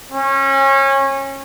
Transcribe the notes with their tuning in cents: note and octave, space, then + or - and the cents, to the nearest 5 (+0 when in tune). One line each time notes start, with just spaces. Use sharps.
C#4 -25